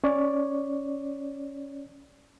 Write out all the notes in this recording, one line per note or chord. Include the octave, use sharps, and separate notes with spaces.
C#4 C#5 D5